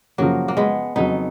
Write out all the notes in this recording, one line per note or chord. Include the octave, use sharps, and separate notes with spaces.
F#2 C#3 F3 F#3 A#3
A#3
G#3 B3
F2 C#3 F#3 B3 D#4